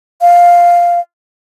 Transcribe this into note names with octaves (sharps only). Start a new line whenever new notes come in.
F5